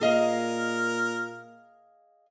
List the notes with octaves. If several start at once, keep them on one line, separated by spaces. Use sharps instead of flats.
A#2 G#4 A#4 D#5 F5